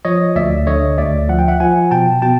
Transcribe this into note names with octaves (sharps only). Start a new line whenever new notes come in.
F3 C#5 D#5
D2 D5 E5
D3 C#5 D#5
D2 D5 E5
F3 F#5
G5
E5 F#5
F3 F#5 G#5
B2 G5 A5
B2 G5 A5